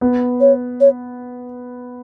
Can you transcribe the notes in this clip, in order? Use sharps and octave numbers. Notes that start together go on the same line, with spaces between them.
B3
C#5
C#5